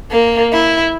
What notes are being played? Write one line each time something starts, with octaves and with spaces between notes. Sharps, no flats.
A#3
E4